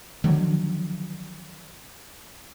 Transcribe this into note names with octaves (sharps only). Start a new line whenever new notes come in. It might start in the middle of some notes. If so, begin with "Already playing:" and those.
D3 D#3 F3 F#3